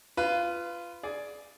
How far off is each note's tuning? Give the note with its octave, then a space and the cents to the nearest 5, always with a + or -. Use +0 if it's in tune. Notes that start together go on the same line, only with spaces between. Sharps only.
F4 -15 B4 +10
G#4 +20 D5 +0